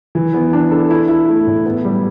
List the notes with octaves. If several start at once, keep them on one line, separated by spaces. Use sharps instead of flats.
E3
B3
D4
A4
E4
E4
A3
A2
B3
G3